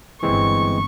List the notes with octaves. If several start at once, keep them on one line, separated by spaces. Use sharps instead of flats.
G1 E3 G#3 C4 C#6